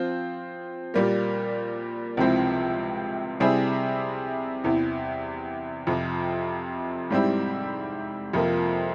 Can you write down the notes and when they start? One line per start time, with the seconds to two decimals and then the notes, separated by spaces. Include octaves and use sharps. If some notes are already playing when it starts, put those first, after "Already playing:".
Already playing: F3 C4 F4 C5
0.94 A#2 G3 A#3
2.17 C#2 C3 F3 C4 E4
3.40 C3 G3 C4 E4 G#4
4.64 E2 C3 E3
5.87 F2 C3 F3
7.10 G#2 G3 C4 E4
8.33 F2 C3 F3 A#3